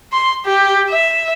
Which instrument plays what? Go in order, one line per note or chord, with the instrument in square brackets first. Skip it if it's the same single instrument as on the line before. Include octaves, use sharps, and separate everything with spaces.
[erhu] C6
G4
E5